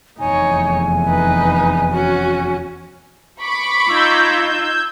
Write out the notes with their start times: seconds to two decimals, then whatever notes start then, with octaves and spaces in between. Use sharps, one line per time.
0.20 F1 E2 D#4 C#5 G#5
1.06 D#4 B4
1.91 C#4 F#4
3.41 B5 C#6 D6
3.89 D#4 F4 E6 G6 G#6